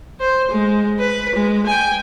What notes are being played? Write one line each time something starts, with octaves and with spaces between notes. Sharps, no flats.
C5
G#3
B4
G#3
G5 G#5